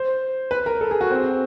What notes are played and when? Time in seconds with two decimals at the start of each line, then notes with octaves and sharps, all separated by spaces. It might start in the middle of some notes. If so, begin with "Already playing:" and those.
Already playing: C5
0.51 B4
0.66 A#4
0.81 A4
0.91 G#4
1.01 F#4
1.11 C4